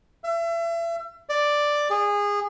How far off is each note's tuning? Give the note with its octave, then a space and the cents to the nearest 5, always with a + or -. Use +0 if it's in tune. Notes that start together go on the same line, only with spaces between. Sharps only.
E5 +35
D5 +5
G#4 -20